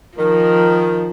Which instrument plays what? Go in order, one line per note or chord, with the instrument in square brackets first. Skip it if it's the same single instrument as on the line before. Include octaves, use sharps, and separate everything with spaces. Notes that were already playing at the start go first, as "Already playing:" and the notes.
[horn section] D#3 [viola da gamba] F3 [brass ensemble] A#4